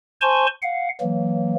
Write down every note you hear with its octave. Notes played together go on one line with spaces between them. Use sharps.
C5 G#5 A5 C6 C#6
F5 F#5
E3 F#3 A#3